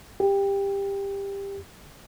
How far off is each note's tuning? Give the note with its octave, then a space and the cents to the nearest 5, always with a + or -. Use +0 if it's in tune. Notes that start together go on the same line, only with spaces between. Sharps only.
G4 +15